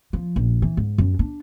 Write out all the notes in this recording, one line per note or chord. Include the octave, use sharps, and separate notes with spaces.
F3
A#1
E3
G#2
F#2
D4